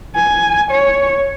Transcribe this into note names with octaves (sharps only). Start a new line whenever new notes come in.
G#5
C#5